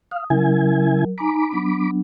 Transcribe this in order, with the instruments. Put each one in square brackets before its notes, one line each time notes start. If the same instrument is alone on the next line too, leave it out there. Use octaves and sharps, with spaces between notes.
[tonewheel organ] F5 [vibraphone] D#6
[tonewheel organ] C#3 E4 G#5 [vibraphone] F#3 A#4
[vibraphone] D#4 G#5 A#5 [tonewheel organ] B5 D6
[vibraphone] F#3 B3 D4